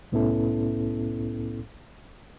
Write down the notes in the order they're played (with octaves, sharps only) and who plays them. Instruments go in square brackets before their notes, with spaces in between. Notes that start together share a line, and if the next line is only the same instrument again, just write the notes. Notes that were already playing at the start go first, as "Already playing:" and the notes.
[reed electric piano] C2 A2 B3 C#4 E4 A4